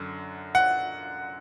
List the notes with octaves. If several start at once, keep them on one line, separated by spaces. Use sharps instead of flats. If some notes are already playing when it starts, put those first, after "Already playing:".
Already playing: F#2 D3
F#5